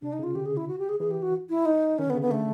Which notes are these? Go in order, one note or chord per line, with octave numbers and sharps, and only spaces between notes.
C3 D4
D#4
C#3
F4
D3 G4
G#4
E4
F#4
G4
G#4
E3 G#4
G4
F#4
E4
D#4
D#3 C#4
D3
B3
C#3
D3 B3
A3